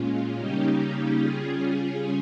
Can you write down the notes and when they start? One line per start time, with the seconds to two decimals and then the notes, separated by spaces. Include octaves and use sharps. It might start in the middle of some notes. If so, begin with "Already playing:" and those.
Already playing: A#2 G#3 C#4 F4
0.38 C#3 G3 A#3 C#4 D#4 G4
1.20 C#3 G3 C#4 F4 G#4